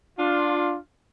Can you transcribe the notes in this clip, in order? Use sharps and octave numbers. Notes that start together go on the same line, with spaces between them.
D4 F4